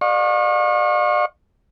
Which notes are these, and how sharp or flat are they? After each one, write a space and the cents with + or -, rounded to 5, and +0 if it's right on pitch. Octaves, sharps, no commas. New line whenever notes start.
D5 +40 F5 +40 C#6 -30